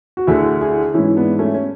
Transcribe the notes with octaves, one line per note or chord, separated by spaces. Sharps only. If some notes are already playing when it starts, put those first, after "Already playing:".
F#4
D2 D3 E4 G#4
E4 G#4
G#2 E3 C#4 E4
B3 D4
A3 C#4
C#4